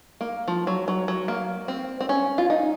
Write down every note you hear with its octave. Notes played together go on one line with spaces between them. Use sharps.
A#3
F3
F#3
F#3
F#3
A#3
C4
C4
C#4
F4
D#4